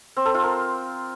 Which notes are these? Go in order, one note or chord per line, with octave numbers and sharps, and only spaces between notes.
C4
A4
F4
A#4